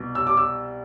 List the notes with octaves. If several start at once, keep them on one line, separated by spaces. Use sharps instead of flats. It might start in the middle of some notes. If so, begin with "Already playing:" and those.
Already playing: C2 B2
E6
D6
E6